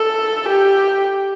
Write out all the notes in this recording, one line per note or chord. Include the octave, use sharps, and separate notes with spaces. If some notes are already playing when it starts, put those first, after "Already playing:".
Already playing: A4
G4